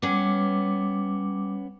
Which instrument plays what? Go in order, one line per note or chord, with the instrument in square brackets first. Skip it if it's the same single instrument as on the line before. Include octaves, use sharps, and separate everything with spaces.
[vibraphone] G3 D6 [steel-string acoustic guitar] B3 C#4